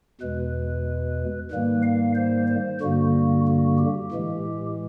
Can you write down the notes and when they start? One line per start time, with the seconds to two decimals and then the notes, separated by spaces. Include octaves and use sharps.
0.21 E2 B2 G#3 B4
1.51 G#2 D#3 G3 A#3 B4
1.83 F5
2.15 C5
2.48 C5
2.81 G2 D3 G3 A#3 F#4
3.47 F#4
3.79 G4
4.11 A2 E3 G#3